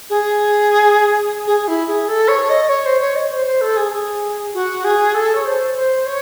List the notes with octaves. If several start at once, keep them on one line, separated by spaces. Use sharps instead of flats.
G#4
G#4
E4
G#4
A4
C#5
D#5
C#5
C5
C#5
D#5
C5
C5
A4
G#4
G#4
F#4
G#4
A4
C#5
C5
C5
C#5